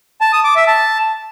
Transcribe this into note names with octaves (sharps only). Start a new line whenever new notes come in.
A5
D#6
D6
E5
A5